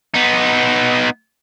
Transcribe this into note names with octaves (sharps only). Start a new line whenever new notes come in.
B3 D#4